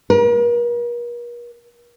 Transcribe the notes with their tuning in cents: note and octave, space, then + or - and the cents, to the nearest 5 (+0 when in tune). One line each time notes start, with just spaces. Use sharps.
A#4 +45